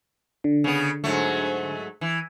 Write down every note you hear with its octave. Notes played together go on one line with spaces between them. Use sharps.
D3
C#3 B3
G#2 F#3 A3
E3